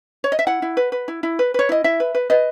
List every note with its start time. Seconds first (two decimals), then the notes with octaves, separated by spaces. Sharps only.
0.24 C#5
0.32 D#5
0.39 E5
0.47 E4 F#5
0.62 E4
0.77 B4
0.92 B4
1.08 E4
1.23 E4
1.39 B4
1.54 B4 C#5
1.69 E4 D#5
1.84 E4 E5
2.00 B4
2.15 B4
2.30 B4 D#5